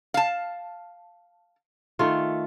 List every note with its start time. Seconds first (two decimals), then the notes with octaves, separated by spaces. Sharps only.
0.14 F5 A5
1.99 D#3 A3 F4